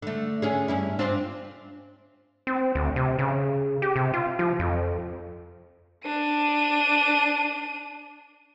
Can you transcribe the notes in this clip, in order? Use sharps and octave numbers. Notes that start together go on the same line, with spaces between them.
D3 A3
D3 C#4 G#4
G2 C#4 E4
C4 D4 F4
C4
D2
C3
C#3
G4
C3
F4
F3
F2
D4 D#7